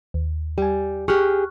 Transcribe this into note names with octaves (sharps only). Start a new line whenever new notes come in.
D#2
G3 G4 G#5
G4 G#4 C#6 F6 F#6